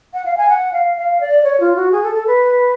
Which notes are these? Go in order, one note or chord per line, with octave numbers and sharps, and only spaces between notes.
F#5
F5
G#5
F#5
F5
F5
D5
C#5
F4
F#4
G#4
A4
A4
B4